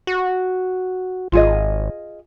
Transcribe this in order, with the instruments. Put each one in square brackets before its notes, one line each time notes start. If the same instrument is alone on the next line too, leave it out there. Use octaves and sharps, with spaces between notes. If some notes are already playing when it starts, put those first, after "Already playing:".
[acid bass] F#4
[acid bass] G#1 [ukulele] F4 G#4 D#5